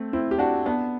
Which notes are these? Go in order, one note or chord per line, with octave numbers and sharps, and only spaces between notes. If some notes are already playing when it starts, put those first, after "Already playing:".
Already playing: A3 C4
C4 E4
G4
D4 F#4
B3 D4